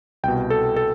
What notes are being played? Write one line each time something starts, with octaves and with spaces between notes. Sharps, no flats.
C2 B2 G5
A4
A4